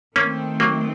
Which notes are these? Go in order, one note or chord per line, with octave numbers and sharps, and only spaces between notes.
D#3 A3 A#3 C4 C#4
F#3 A#3